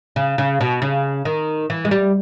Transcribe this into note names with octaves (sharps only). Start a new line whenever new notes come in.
C#3
C#3
B2
C#3
D#3
E3
G#3
G3